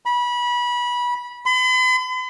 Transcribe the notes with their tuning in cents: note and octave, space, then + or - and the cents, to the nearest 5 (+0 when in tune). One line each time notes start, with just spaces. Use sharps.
B5 -25
B5 +45